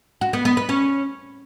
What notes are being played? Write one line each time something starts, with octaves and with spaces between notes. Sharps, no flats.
F#4
B3
B3
B4
C#4